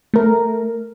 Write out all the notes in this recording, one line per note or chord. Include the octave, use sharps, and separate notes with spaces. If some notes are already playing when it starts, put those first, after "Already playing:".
A3 A#4